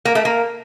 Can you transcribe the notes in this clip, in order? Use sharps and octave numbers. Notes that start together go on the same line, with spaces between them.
A#3
A3
A#3